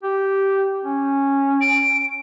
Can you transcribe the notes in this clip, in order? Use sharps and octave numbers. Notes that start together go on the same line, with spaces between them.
G4
C#4
D7